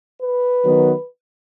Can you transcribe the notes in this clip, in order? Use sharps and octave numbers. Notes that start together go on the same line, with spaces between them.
B4
D#3 F#3 B3